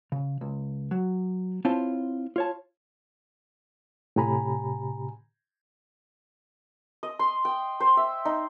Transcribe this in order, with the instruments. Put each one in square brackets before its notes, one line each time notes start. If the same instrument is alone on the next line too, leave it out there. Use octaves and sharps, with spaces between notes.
[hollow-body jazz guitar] C#3
C#2
F#3
C4 E4 F4 C#5 A5
F4 C#5 A5
[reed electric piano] A2 C3 G4 G#5 A#5 B5
[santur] D#5
C6
G5
C5
E5
D#4